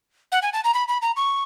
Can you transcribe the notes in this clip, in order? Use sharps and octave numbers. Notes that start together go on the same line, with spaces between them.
F#5
G#5
A5
A#5
B5
B5
A#5
C#6